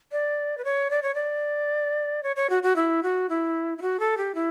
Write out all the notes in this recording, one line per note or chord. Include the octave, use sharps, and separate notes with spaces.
D5
B4
C#5
D5
C#5
D5
C#5
C#5
F#4
F#4
E4
F#4
E4
E4
F#4
A4
G4
E4